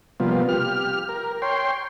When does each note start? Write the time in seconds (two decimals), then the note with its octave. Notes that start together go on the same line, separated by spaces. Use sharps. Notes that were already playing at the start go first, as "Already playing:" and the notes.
0.20 C3 F3 G3 A#3 B3 F4
0.49 G4 F6
1.09 A#4
1.42 C#5 G5 C6